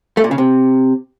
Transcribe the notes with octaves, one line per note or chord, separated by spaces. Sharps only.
A3
A#2
C#3
C3